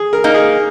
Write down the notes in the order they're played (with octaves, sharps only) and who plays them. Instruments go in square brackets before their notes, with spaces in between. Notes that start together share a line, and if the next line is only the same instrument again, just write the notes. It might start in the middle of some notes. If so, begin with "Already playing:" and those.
Already playing: [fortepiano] G#4
A#4
[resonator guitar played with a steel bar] A#3 D#4
[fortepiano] G#4